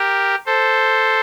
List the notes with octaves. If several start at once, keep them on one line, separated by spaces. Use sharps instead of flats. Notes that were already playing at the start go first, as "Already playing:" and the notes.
Already playing: G4 A#4
A4 C5